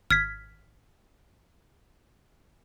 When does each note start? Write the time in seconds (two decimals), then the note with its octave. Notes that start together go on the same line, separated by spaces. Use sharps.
0.11 G#1 F6 G#6 B6